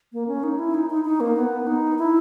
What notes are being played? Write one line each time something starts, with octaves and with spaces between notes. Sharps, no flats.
A#3
C#4
D#4
E4
D#4
D#4
D#4
A#3
B3
D#4
E4